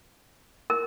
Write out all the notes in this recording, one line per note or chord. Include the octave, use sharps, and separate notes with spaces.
A#4